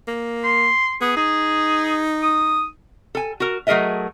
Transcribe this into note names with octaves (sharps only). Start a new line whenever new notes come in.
A#3
C6
B3 G#4
D#4 G#4
D#6
A4 G#5
F#4 A#4
F#3 A3 G#4 A#4 D#5 E5